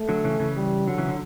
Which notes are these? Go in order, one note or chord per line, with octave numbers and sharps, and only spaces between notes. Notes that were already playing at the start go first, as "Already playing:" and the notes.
Already playing: A3
D3 F#3
C#3 E3
C#3 E3
G3
D3 F#3
C#3 E3
D3